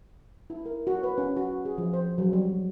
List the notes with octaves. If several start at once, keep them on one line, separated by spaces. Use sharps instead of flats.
E4
A#4
F#4
B4
C#4
F#4
G#4
F3
C5
F#3
G3